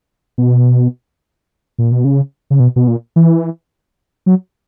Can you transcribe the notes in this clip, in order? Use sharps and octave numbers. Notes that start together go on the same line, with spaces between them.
B2
A#2
B2
C#3
C#3
B2
B2
A#2
E3
F#3